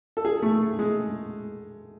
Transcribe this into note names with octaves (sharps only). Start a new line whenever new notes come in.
A4
G#4
A3
G#3